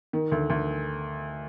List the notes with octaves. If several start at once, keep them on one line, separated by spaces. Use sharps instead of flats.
D#3
D2
D2